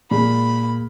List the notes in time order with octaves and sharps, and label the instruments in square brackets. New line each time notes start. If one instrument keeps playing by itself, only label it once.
[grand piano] A#2 G#3 [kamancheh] B5